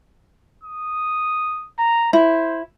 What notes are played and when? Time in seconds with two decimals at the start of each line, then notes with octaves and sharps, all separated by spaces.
0.64 D#6
1.79 A#5
2.13 E4 C5